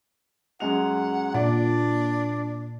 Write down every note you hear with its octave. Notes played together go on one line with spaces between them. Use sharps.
F#2 G#3 F#5 F7
A#2 D4 D5